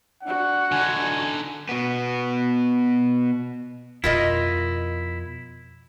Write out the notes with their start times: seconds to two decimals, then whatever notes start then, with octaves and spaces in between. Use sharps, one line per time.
0.23 D4 F#4 F#5
0.72 D3 D#4 G#5
1.69 B2 B3
4.04 F2 B2 E4 F4 A#4 D#5